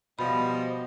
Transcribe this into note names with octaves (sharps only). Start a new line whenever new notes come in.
B2 F3 G3 D#5 B5